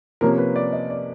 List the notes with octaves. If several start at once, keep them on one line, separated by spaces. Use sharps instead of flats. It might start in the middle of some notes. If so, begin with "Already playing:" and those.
C3 F3 A#3 C#4 A#4
B4
D5
D#5
D5